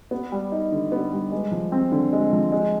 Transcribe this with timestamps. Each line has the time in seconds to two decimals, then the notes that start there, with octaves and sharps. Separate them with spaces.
0.11 B3
0.32 G3
0.52 D#4
0.72 D3
0.92 B3
1.13 G3
1.32 G#3
1.52 F3
1.72 C4
1.92 D3
2.13 G#3
2.33 F3
2.52 G#3